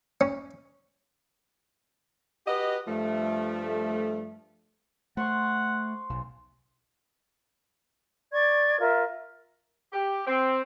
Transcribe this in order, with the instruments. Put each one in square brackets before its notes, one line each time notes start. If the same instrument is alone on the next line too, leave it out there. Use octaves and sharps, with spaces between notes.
[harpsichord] C#4
[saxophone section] F#4 G4 B4 D#5
G2 F3 A3
[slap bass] A3 [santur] C5 C6 C#6 [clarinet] F#5
[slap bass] B1
[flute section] D5 C#6 G#6
F4 A#4 E5
[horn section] G4
C4